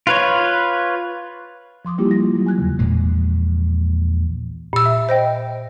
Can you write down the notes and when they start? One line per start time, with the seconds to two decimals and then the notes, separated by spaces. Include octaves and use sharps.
0.07 F4 B4 C#5
1.85 F3 C6 D6 D#6
1.98 G3 A#3 E4 F4 G4
2.11 A#6
2.33 E3 F#3 E4
2.46 G#5 F#6 G#6
2.58 E2 C#3
2.79 A#1 E2 A#2 G#3
4.73 A#2 E6
4.86 E5
5.09 C5 D#5 G5